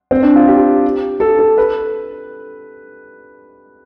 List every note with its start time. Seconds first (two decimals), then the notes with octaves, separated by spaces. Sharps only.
0.11 C4
0.23 D4
0.35 F4
0.48 G4
1.20 A4
1.39 A4
1.58 B4